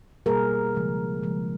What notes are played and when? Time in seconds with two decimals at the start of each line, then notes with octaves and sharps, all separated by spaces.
0.26 B2 G3 A#3 G#4 A#4
0.75 C#3 F3 G#3
1.23 C#3 F3 G#3